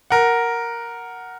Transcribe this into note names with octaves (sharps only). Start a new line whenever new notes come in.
A#4 F#5